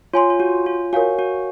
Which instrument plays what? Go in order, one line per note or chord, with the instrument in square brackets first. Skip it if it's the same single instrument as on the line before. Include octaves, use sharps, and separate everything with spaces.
[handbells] F4 [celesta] C#5 G#5 C6
[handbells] F4
F#4
F4
[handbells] F#4 [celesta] A#4 C#5 F5 G#5
[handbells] F#4